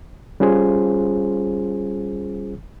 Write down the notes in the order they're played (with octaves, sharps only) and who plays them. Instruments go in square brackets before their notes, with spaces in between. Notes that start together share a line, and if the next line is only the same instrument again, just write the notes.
[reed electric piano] G3 C#4 F4 G#4 C5